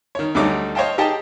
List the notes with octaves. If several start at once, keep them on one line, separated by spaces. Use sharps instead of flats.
D#3 C#5
D2 F#3 G3 A3 D#4 D6
C5 C#5 D#5 F5 G5 A5
D#4 G4 G#4 D#5 G5 A5